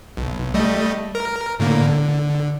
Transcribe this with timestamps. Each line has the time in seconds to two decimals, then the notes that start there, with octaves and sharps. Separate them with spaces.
0.17 B1
0.54 G3 A3 D#5
1.15 A#4
1.60 A2 D3 A#3
1.88 D3